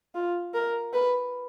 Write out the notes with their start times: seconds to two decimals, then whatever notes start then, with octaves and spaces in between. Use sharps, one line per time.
0.15 F4
0.54 A#4
0.93 B4